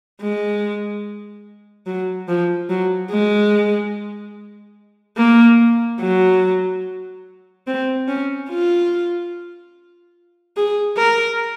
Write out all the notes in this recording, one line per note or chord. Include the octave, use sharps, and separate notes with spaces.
G#3
F#3
F3
F#3
G#3
A#3
F#3
C4
C#4
F4
G#4
A#4